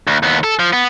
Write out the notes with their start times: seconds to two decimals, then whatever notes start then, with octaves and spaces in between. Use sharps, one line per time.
0.07 D2
0.23 D#2 B3
0.44 A4
0.59 F3
0.73 B3